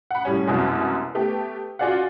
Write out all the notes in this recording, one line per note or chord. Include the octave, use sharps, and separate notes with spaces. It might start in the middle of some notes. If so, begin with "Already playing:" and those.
F#5 B5
A2 G3 C#4
C2 F#2 B2 G#3
A3 B3 G4
F4 F#4 G#4 D5 F5 F#5